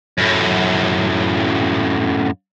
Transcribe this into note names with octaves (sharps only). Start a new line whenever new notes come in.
F#2 A2